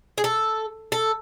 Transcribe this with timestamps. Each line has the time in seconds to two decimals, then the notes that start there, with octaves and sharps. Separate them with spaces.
0.18 G#4
0.24 A4
0.92 A4